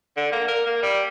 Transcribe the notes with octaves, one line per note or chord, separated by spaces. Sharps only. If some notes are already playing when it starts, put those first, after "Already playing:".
D3
A#3
A#4
A#3
G3